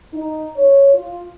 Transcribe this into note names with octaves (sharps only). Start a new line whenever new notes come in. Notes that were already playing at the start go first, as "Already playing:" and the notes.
D#4
C#5
F4